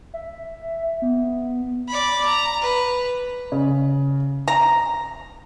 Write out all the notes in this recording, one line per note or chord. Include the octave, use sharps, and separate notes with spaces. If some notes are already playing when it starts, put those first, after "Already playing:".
E5
B3
D5 B5
A#5
B4
C#3
A#5